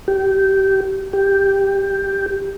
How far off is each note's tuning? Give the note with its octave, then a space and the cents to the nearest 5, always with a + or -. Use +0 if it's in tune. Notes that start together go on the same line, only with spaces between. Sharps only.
G4 -20
G4 +5